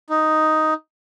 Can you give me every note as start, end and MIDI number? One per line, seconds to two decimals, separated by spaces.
0.10 0.74 63